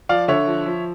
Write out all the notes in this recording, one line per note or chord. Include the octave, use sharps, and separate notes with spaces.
F3 D5 F5
D3 C#5 E5
F3
F3